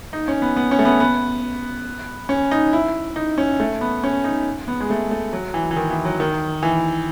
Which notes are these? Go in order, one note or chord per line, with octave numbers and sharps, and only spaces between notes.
D#4
C#4
B3
B3
C#4
A3
B3
B3
C#4
D#4
E4
D#4
C#4
A3
B3
C#4
D#4
B3
G#3
A3
A3
F#3
E3
E3
D#3
E3
F#3
D#3
E3